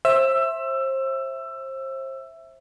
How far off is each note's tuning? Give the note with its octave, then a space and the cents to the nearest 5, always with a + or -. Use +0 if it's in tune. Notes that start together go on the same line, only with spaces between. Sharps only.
C5 +30 E5 +0 E6 +20